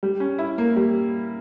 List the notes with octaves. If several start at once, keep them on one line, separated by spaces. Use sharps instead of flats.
G3
C#4
E4
A#3
G3